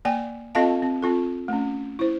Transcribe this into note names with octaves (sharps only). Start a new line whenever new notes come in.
A#3 D5 G5 G#5
C4 F4 A4 D#5 F5 A5
C4
C4 F4 A4
A3 C#4
E4 C5